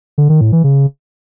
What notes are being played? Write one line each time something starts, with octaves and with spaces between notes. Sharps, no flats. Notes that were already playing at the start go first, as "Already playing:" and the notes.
D3
D#3
A2
E3
C#3